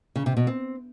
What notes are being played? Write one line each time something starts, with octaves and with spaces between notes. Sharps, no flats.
C#3
C3
B2
C4